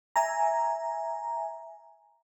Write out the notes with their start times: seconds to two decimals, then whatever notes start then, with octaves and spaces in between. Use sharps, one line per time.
0.16 E5 G#5 A#5